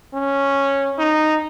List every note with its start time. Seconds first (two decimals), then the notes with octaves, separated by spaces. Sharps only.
0.14 C#4
0.99 D#4